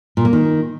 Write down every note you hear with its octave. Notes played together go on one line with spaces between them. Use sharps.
A#2
A#3
D#3